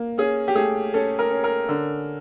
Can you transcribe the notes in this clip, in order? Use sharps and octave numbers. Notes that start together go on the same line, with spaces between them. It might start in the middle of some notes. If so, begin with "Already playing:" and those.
Already playing: A#3
C#4 G#4
G4
A3 G#4
C#4 A4
A#4
C#4
A#4
D3